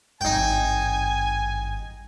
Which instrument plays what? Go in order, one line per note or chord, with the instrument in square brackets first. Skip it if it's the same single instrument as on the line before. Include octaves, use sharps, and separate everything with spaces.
[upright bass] G#1 G2 [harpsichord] D#4 G5 [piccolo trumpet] G#5